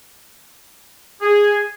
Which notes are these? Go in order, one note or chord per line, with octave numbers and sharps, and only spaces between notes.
G#4